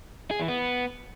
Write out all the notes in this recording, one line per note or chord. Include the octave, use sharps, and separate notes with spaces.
G#4
E3
B3